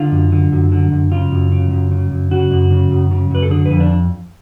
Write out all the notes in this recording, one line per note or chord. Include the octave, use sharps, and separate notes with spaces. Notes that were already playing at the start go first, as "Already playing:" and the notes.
Already playing: D3 F4
F#2
D3
F#2
D3
F#2
C#3 F4
F#2
C#3
F#2
C#3
F#2
C#3 F#4
F#2
C#3
F#2
C#3
F#2 B4
A4
D3 G#4
B4
F2
D4